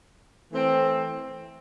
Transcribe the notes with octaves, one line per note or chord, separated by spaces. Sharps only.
E3 A3 C4